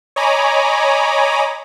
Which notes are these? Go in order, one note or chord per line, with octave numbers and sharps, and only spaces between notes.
C#5 D#5 G#5 A#5 B5 D6